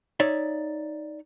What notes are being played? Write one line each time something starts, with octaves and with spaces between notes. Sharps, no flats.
D#4 C#5 D5 E5